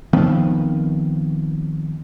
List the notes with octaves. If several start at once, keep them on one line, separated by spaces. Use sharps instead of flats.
D#3 F3 B3 C4